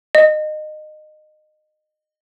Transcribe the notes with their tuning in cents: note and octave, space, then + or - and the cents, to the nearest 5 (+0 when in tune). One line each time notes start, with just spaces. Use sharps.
D#5 -25